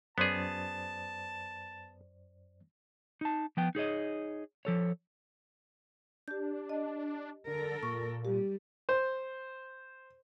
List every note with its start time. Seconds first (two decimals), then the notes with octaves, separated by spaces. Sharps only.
0.18 F#2 B3 G#4 C5 D5 A5
3.21 D#4 A5
3.57 F3 B3 G5
3.75 D#4 G#4 C#5 D#5
4.65 F3 A4 C#5
6.28 D4 G4 G6
6.69 D#5
7.47 D3 A4 A#4
7.83 A#2 C#6
8.25 G3 G4
8.89 C5